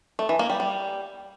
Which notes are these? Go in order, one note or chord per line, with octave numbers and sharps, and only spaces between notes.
A3
E3
A#3
G3
G3